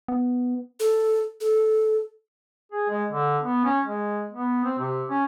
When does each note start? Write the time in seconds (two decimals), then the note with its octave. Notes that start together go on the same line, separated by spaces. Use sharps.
0.08 B3
0.80 A4
1.41 A4
2.72 G#4
2.90 G#3
3.12 D3
3.43 B3
3.65 C#4
3.85 G#3
4.33 B3
4.65 C4
4.79 C3
5.10 C#4